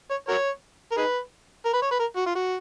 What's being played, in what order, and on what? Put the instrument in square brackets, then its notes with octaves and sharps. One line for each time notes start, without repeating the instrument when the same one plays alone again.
[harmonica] C#5
F#4 A#4 C#5
A#4
D#4 G#4 B4
A#4
B4
C#5
B4
A#4
F#4
F4
F#4